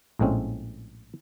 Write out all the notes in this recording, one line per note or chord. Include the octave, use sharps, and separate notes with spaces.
A#1 A2 G#3 C4 C#4